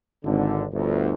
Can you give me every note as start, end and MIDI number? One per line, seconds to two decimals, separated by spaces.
0.24 0.65 32
0.24 0.65 50
0.73 1.14 31
0.73 1.14 38